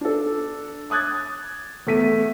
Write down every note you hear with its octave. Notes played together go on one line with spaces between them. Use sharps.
D4 A4
D6 D#6 F#6 G#6 A6
E2 A3 B6 D#7